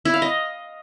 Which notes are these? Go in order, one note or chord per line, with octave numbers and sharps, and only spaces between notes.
E4
F5
D#5